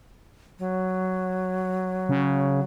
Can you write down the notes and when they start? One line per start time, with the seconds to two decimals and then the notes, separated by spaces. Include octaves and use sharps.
0.59 F#3
2.09 C#3